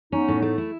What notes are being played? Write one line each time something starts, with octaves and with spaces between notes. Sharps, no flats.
B3 C#4 D#4
A2
A3
E4